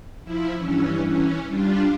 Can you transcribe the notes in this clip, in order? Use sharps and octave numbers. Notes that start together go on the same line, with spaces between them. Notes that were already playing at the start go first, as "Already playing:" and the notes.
F3 E4
G2 E3 C#4
E3 C#4
G3 D4 F4